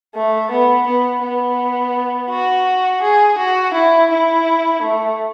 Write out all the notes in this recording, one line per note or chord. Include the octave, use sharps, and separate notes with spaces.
A3
B3
B3
B3
F#4
G#4
F#4
E4
E4
A3